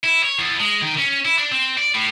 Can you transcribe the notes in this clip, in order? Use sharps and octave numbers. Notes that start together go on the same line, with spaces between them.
E4
C#5
E2
G#3
D#3
C#4
E4
D4
C4
D5
A2